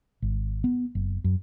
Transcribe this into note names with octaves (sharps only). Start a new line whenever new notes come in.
G#1
B3
F#1
F#2